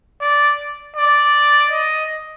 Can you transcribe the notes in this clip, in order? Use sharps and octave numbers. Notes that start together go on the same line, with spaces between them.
D5
D5
D#5